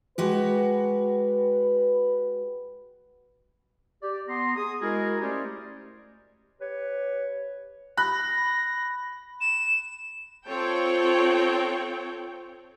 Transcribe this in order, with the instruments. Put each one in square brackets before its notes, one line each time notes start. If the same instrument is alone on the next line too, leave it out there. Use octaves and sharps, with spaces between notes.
[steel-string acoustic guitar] G#3 F#4 G4 [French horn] B4
[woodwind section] G4 D5
B3 A#5 C6
G#4 D#6
G#3 E4 F#4 G#4 A#4
A3 C#4 G4 G#4 C5 D5
G4 B4 C#5
[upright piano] B5 F#6 [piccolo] A#6
[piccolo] E7
[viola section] C4 F4 A4 C#5 G5